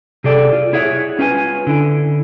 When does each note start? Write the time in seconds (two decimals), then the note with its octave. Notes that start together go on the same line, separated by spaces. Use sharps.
0.24 C3 G#4 A4 D5 G5
0.53 F4
0.73 E4 G#4 C#5 E5 F#5
1.19 C#4 F4 B4 G5 G#5
1.67 D3 E4